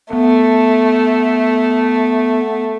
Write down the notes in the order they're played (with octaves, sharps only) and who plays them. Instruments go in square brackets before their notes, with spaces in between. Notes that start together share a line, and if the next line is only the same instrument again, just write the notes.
[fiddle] A3 [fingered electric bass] B3